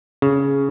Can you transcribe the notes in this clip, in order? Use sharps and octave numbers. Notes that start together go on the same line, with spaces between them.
C#3